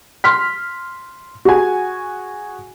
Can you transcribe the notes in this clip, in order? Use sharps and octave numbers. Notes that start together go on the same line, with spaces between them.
C6 F6 B6
F#4 G#4 G#5